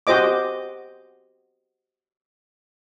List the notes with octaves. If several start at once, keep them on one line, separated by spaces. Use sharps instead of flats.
F#4 G4 C5 D#5 D6